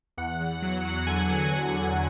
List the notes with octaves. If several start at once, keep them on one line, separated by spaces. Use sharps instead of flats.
E2 F#5
E2
F#3
F#3
D3 G#5
F#3
F#3
D3